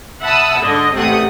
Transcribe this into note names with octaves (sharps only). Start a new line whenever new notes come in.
E5 F#5 A5 B5 D#6 E6
G#2 D3 D#5
A1 C3 A3 C4 F#5 D#6